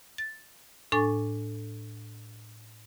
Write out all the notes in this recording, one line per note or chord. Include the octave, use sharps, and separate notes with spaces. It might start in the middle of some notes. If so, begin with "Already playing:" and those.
A6
A2 D4 A4 G#5 C#6 A6